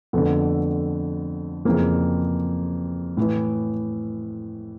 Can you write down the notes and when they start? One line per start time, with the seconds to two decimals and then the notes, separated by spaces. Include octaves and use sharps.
0.13 F2 D3 A3 B3
1.65 F2 C#3 E3 A#3 C4
3.17 A2 E3